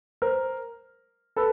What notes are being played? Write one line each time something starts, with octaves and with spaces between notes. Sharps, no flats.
A#4 C5
A4 B4